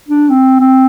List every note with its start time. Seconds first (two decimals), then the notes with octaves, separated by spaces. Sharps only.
0.09 D4
0.30 C4
0.60 C4